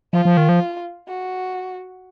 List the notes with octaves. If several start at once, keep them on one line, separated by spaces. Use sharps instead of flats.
F3 F4
F3
D#3
F3
F#4